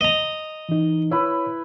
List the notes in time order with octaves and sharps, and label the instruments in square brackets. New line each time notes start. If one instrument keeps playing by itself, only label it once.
[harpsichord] D#5 A#5
[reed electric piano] E3 D#4
[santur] E4 B4 [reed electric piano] C#5